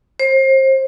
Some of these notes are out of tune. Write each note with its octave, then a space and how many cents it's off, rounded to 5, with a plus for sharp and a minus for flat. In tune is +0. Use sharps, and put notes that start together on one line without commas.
C5 +30